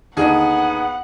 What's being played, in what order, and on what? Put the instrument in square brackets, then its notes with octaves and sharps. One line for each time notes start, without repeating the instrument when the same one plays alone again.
[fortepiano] D#2 D3 [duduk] B3 [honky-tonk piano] D#4 G#4 [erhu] F#5